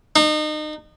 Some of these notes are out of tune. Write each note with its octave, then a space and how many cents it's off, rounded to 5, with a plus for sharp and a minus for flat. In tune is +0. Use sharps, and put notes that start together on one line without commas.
D#4 -30